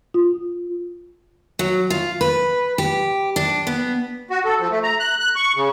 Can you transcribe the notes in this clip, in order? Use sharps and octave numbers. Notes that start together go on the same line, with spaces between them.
F4
F#3
F4
B4
G4
D4
B3
F#4
A4
F3
A3
A#5
F#6
F#6
C#6
C#3